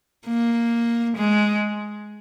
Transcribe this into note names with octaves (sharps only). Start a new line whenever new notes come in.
A#3
G#3